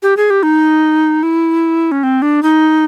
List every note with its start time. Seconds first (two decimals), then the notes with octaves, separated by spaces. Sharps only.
0.03 G4
0.17 G#4
0.30 G4
0.43 D#4
1.23 E4
1.92 C#4
2.03 C4
2.22 D4
2.43 D#4